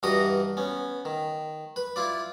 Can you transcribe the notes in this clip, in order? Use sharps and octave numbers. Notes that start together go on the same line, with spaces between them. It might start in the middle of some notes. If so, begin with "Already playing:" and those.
G2 E3 F#4 A#4 D#5 D#6
B3 C#4
D#3
B4
E4 F4 D5